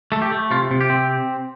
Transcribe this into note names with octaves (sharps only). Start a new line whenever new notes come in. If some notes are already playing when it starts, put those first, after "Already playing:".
A3 A4
G4
A3
C3 F4
C3
G4
C4